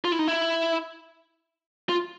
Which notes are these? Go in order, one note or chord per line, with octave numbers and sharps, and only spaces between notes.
F4
E4
D#4
E4
F4